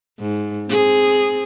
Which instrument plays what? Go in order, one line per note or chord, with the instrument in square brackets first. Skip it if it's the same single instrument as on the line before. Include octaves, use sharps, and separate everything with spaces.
[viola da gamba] G#2
C4 G#4